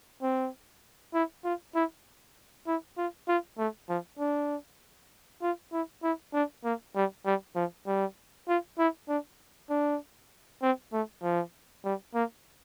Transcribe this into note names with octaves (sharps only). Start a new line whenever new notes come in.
C4
E4
F4
E4
E4
F4
F4
A3
F3
D4
F4
E4
E4
D4
A#3
G3
G3
F3
G3
F4
E4
D4
D4
C4
A3
F3
G3
A#3